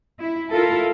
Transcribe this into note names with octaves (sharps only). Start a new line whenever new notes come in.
E4
E4 F4 A4 A#4